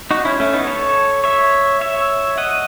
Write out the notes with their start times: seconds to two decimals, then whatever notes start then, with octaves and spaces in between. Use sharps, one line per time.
0.11 D#4 F#4
0.25 C#4 E4
0.40 A3 C#4
0.53 B3 D#4
0.67 A4 C#5
1.24 C#5 E5
1.81 C#5 E5
2.38 D#5 F#5